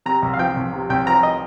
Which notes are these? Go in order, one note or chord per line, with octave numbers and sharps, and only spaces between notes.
C3 A#5
C2
F5
F3 G5
C2
C3
C2 G5
F3 A#5
D#5